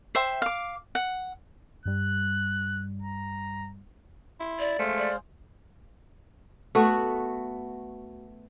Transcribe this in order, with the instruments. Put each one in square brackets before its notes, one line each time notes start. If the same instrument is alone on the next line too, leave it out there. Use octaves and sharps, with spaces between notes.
[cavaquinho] C5 E5 G5
F5 D6
F#5
[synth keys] G2 G3 [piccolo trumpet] F#6
[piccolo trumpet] A#5
[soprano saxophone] E4 [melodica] C6
[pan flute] D5
[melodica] G#3 C5 F5 [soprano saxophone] A3
[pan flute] D5
[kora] A3 B3 F#4